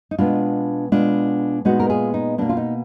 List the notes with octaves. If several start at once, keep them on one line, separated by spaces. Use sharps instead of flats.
D#4
B2 G#3 B3 D4 F4
B2 G#3 B3 D4 F4
A#2 G#3 B3 D#4 F#4
A#4
F4 G#4
D#4
B2 A#3 D4
F4
D#4